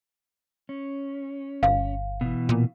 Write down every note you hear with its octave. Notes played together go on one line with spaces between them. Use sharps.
C#4
G1 F5
B2 E3
A#2